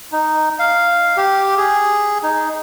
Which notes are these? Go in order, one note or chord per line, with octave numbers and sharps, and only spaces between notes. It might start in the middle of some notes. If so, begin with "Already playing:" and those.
D#4
F5
G4
G#4
D#4